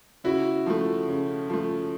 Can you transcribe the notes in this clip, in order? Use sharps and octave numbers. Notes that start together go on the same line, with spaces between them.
C#3 E4 F#4
F3 A3
C#3
F3 A3